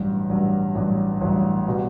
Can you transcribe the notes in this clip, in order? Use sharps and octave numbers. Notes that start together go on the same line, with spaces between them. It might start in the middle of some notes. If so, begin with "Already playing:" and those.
Already playing: A1 G2 F#3
A1 G2 F#3
A1 G2 F#3
A1 G2 F#3
B2 G3